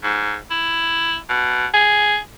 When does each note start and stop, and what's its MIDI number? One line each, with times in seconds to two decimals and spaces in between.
0.03 0.36 44
0.50 1.17 64
1.29 1.66 47
1.74 2.18 68